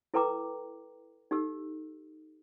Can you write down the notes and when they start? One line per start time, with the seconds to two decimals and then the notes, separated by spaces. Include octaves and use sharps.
0.14 E4 A4 B4 G5 A#5 D6
1.31 D#4 G4 A4 E6